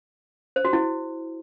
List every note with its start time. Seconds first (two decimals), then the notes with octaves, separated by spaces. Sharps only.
0.56 C5
0.65 F#4
0.73 E4